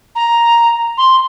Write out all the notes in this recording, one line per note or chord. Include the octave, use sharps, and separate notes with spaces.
A#5
C6